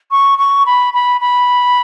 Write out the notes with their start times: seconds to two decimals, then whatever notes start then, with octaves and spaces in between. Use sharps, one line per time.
0.11 C#6
0.38 C#6
0.66 B5
0.94 B5
1.21 B5